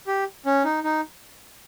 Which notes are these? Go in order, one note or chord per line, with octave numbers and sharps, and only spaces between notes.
G4
C#4
D#4
D#4